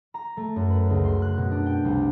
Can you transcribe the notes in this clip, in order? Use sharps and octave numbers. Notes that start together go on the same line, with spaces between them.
A#5
A3
F#2
B4
C#2
C6
F#6
B2
D4
G5
C2